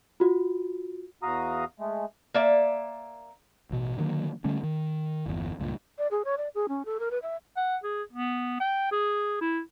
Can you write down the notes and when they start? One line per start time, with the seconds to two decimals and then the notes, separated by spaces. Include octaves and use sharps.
0.20 F4 F#4
1.23 E2 F#4 F5 A#5 D#6
1.80 G#3 A3
2.34 A#3 D5 E5
3.71 A1 B2
3.98 D3 D#3 F#3 A#3
4.44 D3 G3 A3 C#4
4.63 D#3
5.26 G1 E2
5.60 C#2 G2 A#2
5.98 D5
6.11 G#4
6.25 C#5
6.38 D5
6.55 G#4
6.69 C#4
6.85 A4
7.00 A#4
7.11 B4
7.22 E5
7.57 F#5
7.84 G#4
8.12 B3
8.60 G5
8.91 G#4
9.41 E4